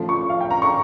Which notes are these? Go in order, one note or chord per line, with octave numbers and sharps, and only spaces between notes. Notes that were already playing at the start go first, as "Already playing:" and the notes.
Already playing: A1 A2 F3
C#6
F5
G5
A#5
C#6